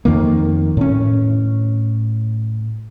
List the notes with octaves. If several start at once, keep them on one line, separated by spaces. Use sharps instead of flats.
F2 D#3 A#3
A2 C#4